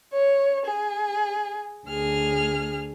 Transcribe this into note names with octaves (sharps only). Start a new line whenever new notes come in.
C#5
G#4
D2 G#4 F6